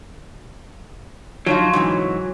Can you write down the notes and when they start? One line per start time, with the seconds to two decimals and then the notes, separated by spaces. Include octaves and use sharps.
1.46 F3 F#3 D#4 F4
1.73 G#2 C#3 E3